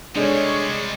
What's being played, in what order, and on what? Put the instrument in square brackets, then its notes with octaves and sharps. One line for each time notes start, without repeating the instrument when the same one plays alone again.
[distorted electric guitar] C3 G3 [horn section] G#3 [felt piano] D4 G#4 A4 [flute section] C#5